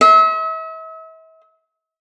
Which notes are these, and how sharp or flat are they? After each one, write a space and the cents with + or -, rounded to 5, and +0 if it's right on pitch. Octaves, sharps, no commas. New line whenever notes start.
E5 -40 C6 +0